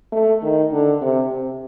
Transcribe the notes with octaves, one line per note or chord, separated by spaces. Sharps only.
A3
D#3
D3
C3
C3